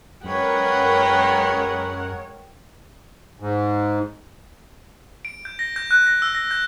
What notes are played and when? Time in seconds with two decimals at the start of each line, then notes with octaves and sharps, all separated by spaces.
0.24 F#2 G#3 A#4 B4 C#5 F#5 G5
3.40 G#2
5.25 D7
5.45 G6
5.59 A#6
5.76 G6
5.91 F#6
6.06 A#6
6.22 E6
6.35 A#6
6.51 G6